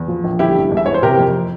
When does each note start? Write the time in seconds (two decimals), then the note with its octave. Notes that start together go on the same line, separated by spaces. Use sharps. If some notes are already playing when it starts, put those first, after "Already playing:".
Already playing: E2
0.08 F3
0.24 A#1
0.39 G1 E4 G4
0.55 G2
0.71 E1
0.77 E5
0.86 E3 C#5
0.94 C5
1.02 C3 G4 A#4
1.19 F2